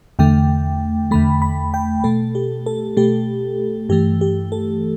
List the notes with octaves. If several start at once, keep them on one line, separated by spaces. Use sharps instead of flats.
E2 D3 A3 G5
E2 D3 A3 B5
B5
G5
B2 A3 A4
G4
A4
B2 A3 G4
G2 E3 A3 G4
G4
A4